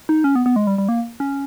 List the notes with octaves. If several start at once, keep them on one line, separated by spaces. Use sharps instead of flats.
D#4
C#4
B3
B3
G#3
G3
G3
A#3
C#4